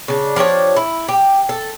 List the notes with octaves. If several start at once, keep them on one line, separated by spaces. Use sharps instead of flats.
C#3 D4
F3 D4 G4 C#5
E4
G4
A4